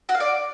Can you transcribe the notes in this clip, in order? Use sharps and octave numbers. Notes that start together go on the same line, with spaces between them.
F#4
F5
D5